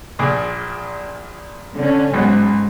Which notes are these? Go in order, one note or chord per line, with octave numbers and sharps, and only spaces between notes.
A#1 A#2 G#4
D3 C#4
B1 G#2 F#5